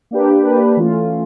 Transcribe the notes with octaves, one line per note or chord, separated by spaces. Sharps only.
A#3 D4 G4 B4
A#3 D4 G4 B4
E3 A3 C#4 F4